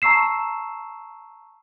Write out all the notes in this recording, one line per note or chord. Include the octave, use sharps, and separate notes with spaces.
A5 A#5 C#6 E6 C7 E7